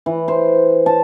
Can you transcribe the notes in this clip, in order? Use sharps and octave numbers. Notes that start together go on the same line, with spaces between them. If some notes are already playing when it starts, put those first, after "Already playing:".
E3
C5
A5